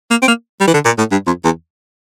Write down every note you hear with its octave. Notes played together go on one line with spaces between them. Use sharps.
A#3
C4
A#3
G3
E3
D3
A#2
A2
G2
F2
E2